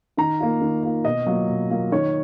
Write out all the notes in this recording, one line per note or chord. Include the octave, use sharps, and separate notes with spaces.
D#3 A#5
A#3 F4
D#3
A#3 F4
B2 D#5
F#3 A#3 F4
B2
F#3 A#3 F4
D#3 C#5